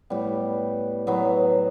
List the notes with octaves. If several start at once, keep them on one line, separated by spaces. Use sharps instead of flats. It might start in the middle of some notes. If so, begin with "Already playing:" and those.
A2 G3 B3
A2 F#3 B3